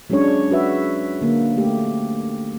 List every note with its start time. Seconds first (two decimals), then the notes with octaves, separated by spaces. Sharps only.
0.10 F#3 G#3 C#4 D4 C#5
0.50 F#3 F#4 B4 E5
1.21 D3 A#3
1.56 A3 G4